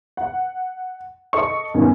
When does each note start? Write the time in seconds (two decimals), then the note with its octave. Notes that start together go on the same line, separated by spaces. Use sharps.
0.17 F#5
1.33 A4 D#5 C#6
1.74 E2 G2 D#3 C#4